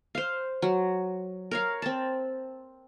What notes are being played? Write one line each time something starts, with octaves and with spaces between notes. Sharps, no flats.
C5 F5
F#3
A#4 C#5 F5
C4 A5